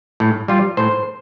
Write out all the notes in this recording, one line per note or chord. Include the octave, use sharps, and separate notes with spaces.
A2
G3 F4
A2 C5